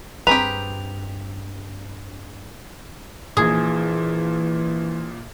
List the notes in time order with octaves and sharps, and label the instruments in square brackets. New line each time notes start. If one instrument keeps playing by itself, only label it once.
[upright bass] G2 [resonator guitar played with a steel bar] C4 A#5 [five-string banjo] G4 G#4 B4 [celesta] F7
[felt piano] A#1 A#2 [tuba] E3 [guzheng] G#4